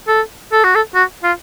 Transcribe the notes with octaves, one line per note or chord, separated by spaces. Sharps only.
A4
A4
F#4
A4
F#4
F4